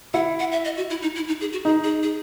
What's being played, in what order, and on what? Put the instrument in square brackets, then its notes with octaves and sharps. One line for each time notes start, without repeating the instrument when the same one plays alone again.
[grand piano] E4 [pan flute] F#5
[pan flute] F#5
E5
D#5
F#4
E4
D#4
E4
D#4
G#4
F#4
[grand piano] D#4 [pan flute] G#4
[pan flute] G#4
G#4